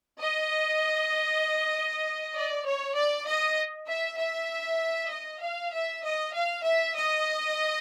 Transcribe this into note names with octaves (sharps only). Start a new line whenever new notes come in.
D#5
D5
C#5
D5
D#5
E5
E5
D#5
F5
E5
D#5
F5
E5
D#5